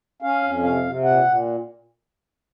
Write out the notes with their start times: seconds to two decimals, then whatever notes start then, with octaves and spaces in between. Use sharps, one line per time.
0.22 C#4 F5
0.43 F2
0.63 C3 F5
0.84 C3
1.04 A#2 F#5
1.24 A#2